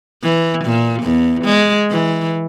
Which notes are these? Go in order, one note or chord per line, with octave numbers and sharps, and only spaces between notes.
E3
A#2
E2
G#3
E3